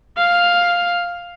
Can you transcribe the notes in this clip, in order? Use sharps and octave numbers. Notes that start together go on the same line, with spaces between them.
F5